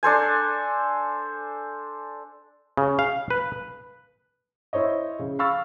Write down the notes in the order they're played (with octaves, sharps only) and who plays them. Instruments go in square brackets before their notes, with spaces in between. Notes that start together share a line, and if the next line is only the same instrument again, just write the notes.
[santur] D4 A4 C5 G#5
[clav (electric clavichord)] C#3
F5
B4
[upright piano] E4 C5 C#5 D#5
C#3
F5 B5 C#6 E6 F6 A6